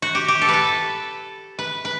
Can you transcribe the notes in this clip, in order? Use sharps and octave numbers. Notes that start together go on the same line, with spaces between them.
F#4
G4
G4
A4
B4
A4
B4
B4